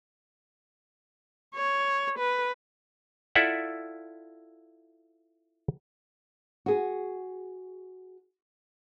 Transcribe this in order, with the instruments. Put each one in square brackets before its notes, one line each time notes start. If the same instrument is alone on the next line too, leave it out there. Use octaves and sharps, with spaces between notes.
[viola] C#5
B4
[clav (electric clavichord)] E4 F4 A4 D5 E5 F#5
[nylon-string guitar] F#4 G#4